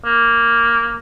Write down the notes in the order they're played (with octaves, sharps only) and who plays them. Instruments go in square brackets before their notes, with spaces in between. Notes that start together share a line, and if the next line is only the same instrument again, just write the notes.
[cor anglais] A#3